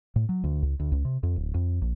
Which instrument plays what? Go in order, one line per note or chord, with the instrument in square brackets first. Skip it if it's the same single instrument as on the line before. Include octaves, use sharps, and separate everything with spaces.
[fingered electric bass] A2
F#3
D2
C#2
D2
C#2
C3
F2
D1
F2
A#1